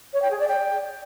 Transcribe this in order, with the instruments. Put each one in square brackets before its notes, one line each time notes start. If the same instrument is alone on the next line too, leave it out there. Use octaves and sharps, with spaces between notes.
[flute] C#5
G5
G#4
D5
G5